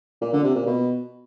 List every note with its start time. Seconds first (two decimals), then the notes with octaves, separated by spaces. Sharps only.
0.22 A#2
0.33 D3
0.44 C3
0.55 A#2
0.66 B2